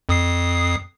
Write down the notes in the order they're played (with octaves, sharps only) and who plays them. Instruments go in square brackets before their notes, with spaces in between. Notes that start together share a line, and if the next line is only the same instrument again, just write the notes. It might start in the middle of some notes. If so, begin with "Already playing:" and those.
[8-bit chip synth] F2 D#6 C7